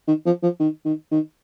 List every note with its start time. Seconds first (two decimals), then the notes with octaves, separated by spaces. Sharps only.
0.08 D#3
0.26 F3
0.43 F3
0.60 D#3
0.85 D#3
1.12 D#3